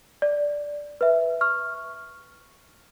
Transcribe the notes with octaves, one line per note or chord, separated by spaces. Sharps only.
D5
B4 E5
C#6 F6